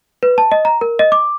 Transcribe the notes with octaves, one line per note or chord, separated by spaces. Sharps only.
B4
A5
D#5
A#5
A#4
D#5
D6